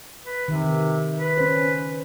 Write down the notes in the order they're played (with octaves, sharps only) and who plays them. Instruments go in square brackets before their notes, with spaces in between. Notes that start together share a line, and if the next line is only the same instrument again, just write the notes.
[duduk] B4
[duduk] C3 [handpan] D#3
[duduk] B4
[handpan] C#4 C5